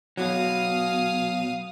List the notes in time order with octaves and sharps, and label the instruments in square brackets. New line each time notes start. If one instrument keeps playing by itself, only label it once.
[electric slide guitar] B2 F#3 [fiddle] F5 D#6